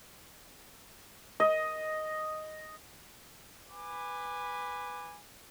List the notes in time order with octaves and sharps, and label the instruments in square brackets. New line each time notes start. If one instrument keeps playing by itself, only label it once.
[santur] D#5
[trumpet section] B4 G#5 B5 D6